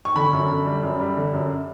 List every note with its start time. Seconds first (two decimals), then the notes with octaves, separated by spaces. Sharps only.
0.05 C#6
0.15 D3 B5
0.33 F#2
0.49 D3
0.66 G3
0.83 F#2
1.00 G3
1.17 D3
1.33 F#2